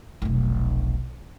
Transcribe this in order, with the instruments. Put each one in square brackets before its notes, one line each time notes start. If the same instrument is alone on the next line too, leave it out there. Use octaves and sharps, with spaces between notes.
[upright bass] F1 B1